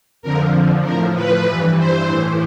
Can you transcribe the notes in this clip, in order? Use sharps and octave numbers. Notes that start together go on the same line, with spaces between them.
F2 D3 F3 A#4
A2 F3 A#4
B4
G2 E3 B4
C5
A2 E3